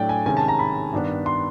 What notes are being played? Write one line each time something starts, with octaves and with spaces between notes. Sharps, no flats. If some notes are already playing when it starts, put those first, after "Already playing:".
Already playing: A2 F#3 A3 D4 D5 G5
G#5
C3 D#3 G#3 C#4 G#5
A5
A#5
B5
G2 D#3 G3 B3 D4
C6